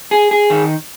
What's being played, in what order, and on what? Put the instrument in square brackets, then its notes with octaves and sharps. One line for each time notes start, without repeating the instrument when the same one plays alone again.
[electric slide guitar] G#4
G#4
D#3